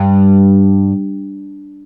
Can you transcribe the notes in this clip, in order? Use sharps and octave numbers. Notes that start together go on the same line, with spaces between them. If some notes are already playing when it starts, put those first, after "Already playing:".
Already playing: G2